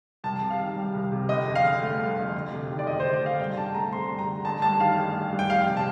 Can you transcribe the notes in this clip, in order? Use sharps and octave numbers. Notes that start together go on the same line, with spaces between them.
C2 A5
C3
F5
D#3
G3
C2
C3
G1 D#5
F2
F5
D3
A3
G1
F2
D2
C3
D#3
D5
D2 D#5
C5
D2
D5
C3 F5
G2 G5
D3 A5
A3 A#5
C4 C6
G2
A#5
D3
A1 A5
G2 A5
D#3 F5
A1
A1
G2
G5
F2 F5
C3
A5